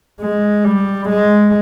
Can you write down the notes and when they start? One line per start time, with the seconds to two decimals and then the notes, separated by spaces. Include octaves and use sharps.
0.21 G#3
0.64 G3
1.09 G#3